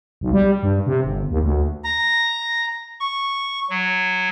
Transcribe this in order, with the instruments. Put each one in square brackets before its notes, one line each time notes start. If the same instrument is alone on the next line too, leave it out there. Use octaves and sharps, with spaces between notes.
[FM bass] B1
G3
G2
C3
G1
D#2
D2
[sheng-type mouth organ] A#5
[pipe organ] C#6
F#3